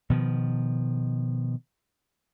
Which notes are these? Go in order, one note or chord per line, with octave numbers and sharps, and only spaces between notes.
B2 D#3 F3